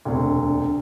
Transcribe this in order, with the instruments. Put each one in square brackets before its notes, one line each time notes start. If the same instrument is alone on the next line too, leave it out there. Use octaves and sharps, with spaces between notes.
[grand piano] E1 D2 C3